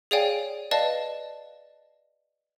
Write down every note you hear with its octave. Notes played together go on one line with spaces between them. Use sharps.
G#4 C#5 D5 F5 G5 G#5
B4 D5 D#5 F5 A5